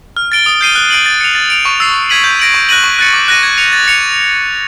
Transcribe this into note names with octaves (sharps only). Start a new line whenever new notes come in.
F6
A6 D7 G7
D#6
G6 C7 D#7 G7
F#6
A6 D7 F#7
A6
C#7 F7
A6
D7 F7
C#6
E6 A6 C7
E6
G#6 B6 D#7 F#7
G6
A#6 D7 F#7
C#6
F#6 A#6 D#7 F#7
C#6
F#6 A6 C#7
D6
F#6 A#6 D#7
G#6
C#7 F7
A6
C#7 F7